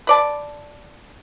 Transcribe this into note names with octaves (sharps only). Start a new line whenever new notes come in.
B4 D5 A5